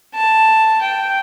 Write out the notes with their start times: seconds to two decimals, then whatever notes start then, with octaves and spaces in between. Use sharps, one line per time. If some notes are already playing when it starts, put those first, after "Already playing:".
0.14 A5
0.81 G5